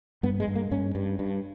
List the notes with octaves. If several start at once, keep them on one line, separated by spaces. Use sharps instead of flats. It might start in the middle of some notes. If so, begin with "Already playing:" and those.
G2 B3
G#3
G2
A#3
G2 C#4
G2
G2